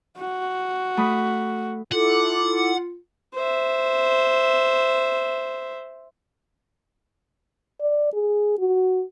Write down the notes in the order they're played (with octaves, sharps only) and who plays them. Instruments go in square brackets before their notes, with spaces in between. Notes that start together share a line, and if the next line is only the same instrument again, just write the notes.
[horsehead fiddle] F#4
[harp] A3 B5 D#6
[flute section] E4 A4 D6 [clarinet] F4 [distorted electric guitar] F#5
[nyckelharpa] C5 E5
[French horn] D5
G#4
F#4